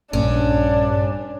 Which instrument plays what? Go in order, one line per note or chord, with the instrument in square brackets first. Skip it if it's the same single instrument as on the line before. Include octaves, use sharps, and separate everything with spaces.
[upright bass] A#1 [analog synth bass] G2 [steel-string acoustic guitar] C#4 [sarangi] D4